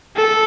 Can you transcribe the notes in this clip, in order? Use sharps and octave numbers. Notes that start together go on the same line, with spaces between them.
A4